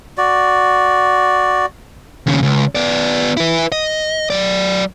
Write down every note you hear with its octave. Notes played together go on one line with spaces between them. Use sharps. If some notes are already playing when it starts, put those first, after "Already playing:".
F#4 D5
D#2 C#3
C#2
B3 D5
E4 B4
D#5
F#3 D5